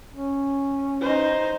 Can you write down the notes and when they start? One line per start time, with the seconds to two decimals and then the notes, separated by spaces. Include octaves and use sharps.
0.12 C#4
1.01 D#4 C5